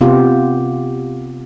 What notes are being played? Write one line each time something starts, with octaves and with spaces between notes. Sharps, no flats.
C3 B3 F4 G4